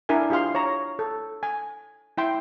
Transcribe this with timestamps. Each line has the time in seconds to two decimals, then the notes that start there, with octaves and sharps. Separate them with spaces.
0.09 D4 E4 A#4 D5 G#5
0.30 F4 G4 G#4 F5 C6
0.55 C#5 A#5
0.99 A4
1.43 G#5
2.18 E4 G5 C6